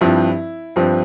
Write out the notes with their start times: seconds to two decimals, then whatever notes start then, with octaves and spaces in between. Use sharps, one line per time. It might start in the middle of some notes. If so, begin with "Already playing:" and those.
0.01 G2 F3 C4 E4
0.76 G2 F3 C4